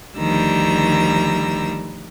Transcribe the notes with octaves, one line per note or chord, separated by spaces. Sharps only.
D2 D#3 F3 G3 A#5 E6